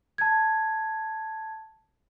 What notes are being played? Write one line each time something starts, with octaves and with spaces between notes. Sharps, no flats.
A5 G#6